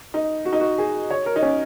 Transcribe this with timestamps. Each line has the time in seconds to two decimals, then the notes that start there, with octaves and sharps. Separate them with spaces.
0.14 D#4
0.45 F#4
0.53 D#4
0.60 F#4
0.78 G#4
1.11 C#5
1.26 A#4
1.36 D#4
1.42 C#4